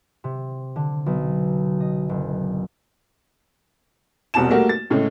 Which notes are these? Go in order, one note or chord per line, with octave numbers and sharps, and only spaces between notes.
C3
D3
B1
D#5
F#1
E1 C2 B2 A5 E7
G3 A3 A#3 F#4 A#4
A6
A2 C#3 G#3 A3